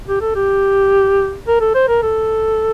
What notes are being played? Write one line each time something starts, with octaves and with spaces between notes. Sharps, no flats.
G4
A4
G4
A#4
A4
C5
A#4
A4